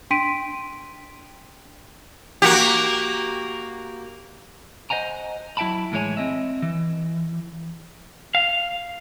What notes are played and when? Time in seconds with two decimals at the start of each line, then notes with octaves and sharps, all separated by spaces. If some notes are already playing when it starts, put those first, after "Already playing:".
0.11 D4 G5 C6 B6 D7 D#7
2.42 A#3 F#4 G4
4.90 C5 D#5 F#5 G#5 A#5
5.57 F#3 E4 E5 G5 A5 B5
5.92 A2 E3 G#3 E4 C#5 G#5
6.17 C4 D#5 E5
6.62 E3
8.35 F5